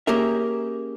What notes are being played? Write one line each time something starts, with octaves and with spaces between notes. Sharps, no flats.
A#3 C#4 G4 G#4 A#4 E5